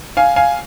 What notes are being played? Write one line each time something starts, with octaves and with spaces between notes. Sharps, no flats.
F5 G#5
F5 G#5